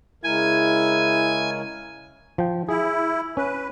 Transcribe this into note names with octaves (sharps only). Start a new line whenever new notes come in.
C#3 G#3 E4 A#4 G#5
F3 G5
E4 G#4
C#4 B4